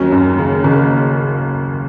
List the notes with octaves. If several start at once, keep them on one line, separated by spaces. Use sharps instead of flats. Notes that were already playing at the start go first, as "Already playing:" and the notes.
Already playing: D#2 F#3 C#4
F#2
C#3
F#1